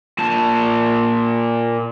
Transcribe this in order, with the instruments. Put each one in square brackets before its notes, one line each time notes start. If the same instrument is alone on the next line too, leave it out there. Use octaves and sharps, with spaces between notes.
[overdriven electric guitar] A#2 A5